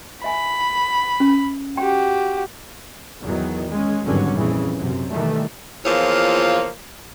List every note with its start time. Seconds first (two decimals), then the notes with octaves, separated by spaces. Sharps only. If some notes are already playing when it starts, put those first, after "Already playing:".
0.24 E5 G#5 B5
1.20 C#4
1.77 F#4 G4 G5
3.21 E2 D#3 F#3
3.69 G#3 C#4
4.04 G#1 E2 G2 D3 F#3 C#4
4.34 A#1 F2 C#3 E3
4.76 F#2 C3
5.12 B2 D#3 E3 G3 A3
5.85 E2 F3 A#3 F4 C#5